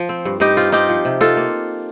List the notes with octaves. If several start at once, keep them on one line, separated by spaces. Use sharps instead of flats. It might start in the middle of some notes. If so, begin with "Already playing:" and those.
Already playing: F3
C4
G2
G2 D#4 G4
C4 F4
C4 D#4 G4
F3
C3
D#4 F4 A4
A#3